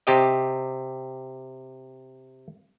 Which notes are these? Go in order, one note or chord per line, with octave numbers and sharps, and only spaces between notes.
C3 G4 D#5